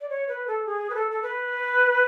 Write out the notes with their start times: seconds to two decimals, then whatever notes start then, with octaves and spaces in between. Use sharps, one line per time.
0.01 D5
0.10 C#5
0.28 B4
0.47 A4
0.66 G#4
0.90 B4
0.95 A4
1.11 A4
1.22 B4